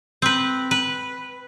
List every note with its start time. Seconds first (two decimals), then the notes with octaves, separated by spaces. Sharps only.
0.22 C4 B4
0.71 B4